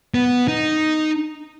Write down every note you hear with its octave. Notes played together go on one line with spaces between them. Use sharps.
B3
D#4